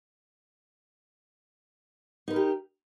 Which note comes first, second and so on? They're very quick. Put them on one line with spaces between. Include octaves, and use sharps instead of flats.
D#4 B4 A#4 G4